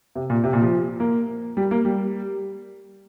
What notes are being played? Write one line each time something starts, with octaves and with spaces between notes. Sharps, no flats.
C3
A#2
C3
A#2
F3
A#3
G3
A#3
G3